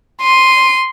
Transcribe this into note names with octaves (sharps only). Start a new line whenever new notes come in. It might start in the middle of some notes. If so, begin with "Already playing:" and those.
C6 D#7